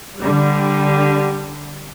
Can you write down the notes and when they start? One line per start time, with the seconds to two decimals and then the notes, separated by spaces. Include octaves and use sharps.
0.20 D3 G3